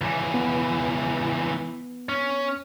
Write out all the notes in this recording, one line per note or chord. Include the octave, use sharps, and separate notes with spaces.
C#2 E3
B3
C#4